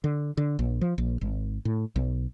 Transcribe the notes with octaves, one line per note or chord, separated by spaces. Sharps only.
D3
D3
A#1
F3
A#1
G#1
A2
B1